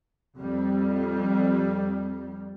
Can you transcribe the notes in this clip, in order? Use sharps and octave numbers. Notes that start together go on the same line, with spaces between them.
F2 G3